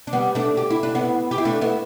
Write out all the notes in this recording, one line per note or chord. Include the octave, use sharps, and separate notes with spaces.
D4
G3 B3
A3 D4
G4
E4
D4
B3 E4
G4
E4
A3 D4
B3 E4